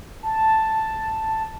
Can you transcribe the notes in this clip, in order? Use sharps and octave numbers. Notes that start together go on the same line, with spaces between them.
A5